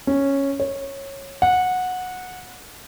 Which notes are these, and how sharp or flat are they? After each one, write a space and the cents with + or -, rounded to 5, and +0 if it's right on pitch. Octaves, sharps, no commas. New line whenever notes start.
C#4 -5
C#5 -15
F#5 -15